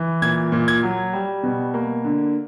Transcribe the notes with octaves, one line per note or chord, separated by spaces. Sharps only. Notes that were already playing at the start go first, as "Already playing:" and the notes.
Already playing: E3
A#2 G#6
A#2
G#6
F#3
G3
B2
A#3
D3